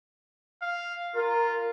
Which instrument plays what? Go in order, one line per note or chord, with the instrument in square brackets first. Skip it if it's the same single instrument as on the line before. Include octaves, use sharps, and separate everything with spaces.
[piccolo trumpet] F5
[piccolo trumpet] F4 [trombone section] A#4